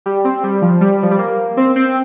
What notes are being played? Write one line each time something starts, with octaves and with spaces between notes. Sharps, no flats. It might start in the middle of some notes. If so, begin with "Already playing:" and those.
G3
C4
G3
F3
G3
F3
G3
A#3
C4
C4